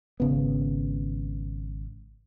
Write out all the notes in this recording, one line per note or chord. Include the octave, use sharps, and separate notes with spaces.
G#1 C#3 B3